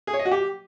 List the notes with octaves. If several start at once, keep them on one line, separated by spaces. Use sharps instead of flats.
G#4
C#5
D#5
F#4
G4